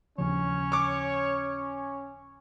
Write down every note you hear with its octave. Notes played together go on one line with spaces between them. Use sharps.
D#2 C#3 F3 C#4 C#5
C#6 D6